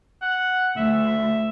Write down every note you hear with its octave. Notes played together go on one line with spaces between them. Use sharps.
F#5
D2 E5